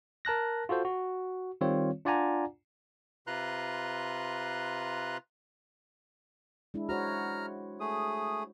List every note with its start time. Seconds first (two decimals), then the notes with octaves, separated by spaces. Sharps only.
0.25 A#4 A5 F#6 A#6
0.69 F4 F#4 A4 C5
0.85 F#4
1.61 D#3 G3 C4 F4 C#5
2.05 D4 F4 D5 F#5 G#5 A#5
3.27 C3 F4 B4 A#5 C6 F#6
6.74 G#3 D4 E4
6.89 F#4 C5 C#5 A#5 F6
7.80 A3 G#4 D#6